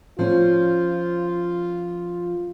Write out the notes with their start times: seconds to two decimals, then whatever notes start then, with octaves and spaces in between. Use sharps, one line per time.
0.19 F3 C#4 F4